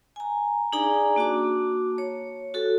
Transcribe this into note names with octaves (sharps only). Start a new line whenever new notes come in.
G#5 A#5
D4 D#4 G#4 D5 G#5 A#5
A#3 F#4 A5 D6
C#5
F#4 A4